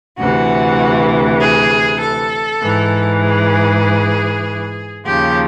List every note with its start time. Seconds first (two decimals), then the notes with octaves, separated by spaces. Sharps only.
0.19 D2 C3 E3 F#4
1.41 G#4
2.01 A4
2.63 G#2 E3
3.24 G#4
5.07 D#2 C#3 F3 G4